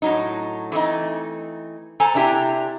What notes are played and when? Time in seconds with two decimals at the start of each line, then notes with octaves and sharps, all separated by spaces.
0.02 A2 F#3 D#4
0.72 E3 A3 C4 D#4
2.00 A4 C5 G#5 A#5
2.14 C3 D4 E4 G4 A#5